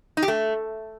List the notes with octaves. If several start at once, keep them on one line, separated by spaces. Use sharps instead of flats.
D#4
G4
A3